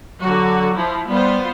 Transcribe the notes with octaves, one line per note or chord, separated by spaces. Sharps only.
D3 F#3 F#4
F3 E4
G3 B3 F4 C5